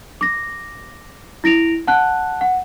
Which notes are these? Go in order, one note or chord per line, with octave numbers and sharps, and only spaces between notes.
D6 A#6
E4 A#6 D7 F7
F#5 A5 F#6
F#5